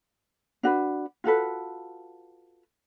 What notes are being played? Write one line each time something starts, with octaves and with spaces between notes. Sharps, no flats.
D4 F#4 B4
F4 F#4 A4 B4